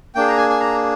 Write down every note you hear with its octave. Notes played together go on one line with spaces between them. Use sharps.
A#3 D4 G#4 G5
A#5
G#5
G#5
A#5